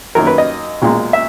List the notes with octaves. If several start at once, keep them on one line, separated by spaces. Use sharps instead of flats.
F#2 D#3 A#3 A#4
B4
D#5
B1 A#2 G#3
E5